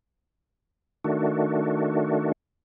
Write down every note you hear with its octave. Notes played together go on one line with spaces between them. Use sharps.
D#3 A3 D4 F#4